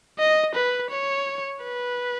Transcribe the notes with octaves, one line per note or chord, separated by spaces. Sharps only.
D#5
B4
C#5
B4